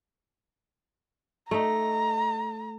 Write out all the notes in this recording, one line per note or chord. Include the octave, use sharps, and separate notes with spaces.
A3 D#4 A#5